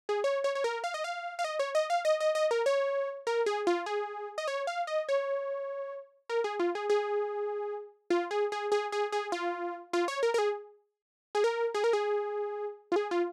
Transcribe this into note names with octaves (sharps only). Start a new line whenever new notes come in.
G#4
C#5
C#5
C#5
A#4
F5
D#5
F5
F5
D#5
C#5
D#5
F5
D#5
D#5
D#5
A#4
C#5
A#4
G#4
F4
G#4
D#5
C#5
F5
D#5
C#5
A#4
G#4
F4
G#4
G#4
F4
G#4
G#4
G#4
G#4
G#4
F4
F4
C#5
A#4
A#4
G#4
G#4
A#4
G#4
A#4
G#4
F4
G#4
F4